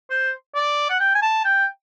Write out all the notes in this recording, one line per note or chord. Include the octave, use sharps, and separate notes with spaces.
C5
D5
F#5
G5
G#5
A5
G5